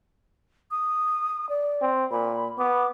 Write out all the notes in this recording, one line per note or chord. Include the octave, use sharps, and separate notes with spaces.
D#6
D5
C4
A#2 B5
B3 D6